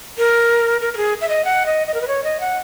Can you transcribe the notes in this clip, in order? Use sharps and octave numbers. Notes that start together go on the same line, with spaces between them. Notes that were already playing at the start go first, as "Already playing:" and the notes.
A#4
A#4
A#4
G#4
E5
D#5
F#5
D#5
D#5
A#4
B4
C#5
D#5
F#5